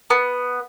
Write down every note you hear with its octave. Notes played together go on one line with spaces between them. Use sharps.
B3